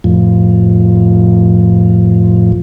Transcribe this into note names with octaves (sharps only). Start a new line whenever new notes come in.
F2 A2 F3